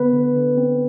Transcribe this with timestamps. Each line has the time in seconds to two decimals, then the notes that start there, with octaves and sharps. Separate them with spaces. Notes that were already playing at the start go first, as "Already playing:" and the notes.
Already playing: D3 B3 B4
0.13 D3
0.36 D3
0.57 C4